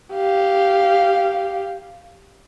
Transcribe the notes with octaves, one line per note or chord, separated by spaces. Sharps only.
G4 F5